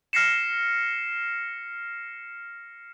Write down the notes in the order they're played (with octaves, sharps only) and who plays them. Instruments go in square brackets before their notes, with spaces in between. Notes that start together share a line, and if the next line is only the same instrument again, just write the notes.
[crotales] F6 A#6 C7 C#7 E7